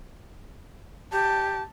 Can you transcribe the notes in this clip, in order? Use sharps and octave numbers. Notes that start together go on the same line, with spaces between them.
G4 A5